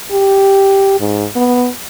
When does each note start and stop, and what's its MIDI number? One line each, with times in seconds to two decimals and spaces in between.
0.12 0.97 67
1.00 1.25 44
1.36 1.69 59